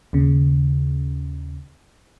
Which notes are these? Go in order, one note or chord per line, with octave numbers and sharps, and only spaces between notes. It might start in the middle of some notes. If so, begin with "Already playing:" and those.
D#2 C#3